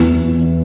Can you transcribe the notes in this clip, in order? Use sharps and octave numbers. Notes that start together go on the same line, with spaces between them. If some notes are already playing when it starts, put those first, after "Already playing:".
Already playing: E2 E3 B3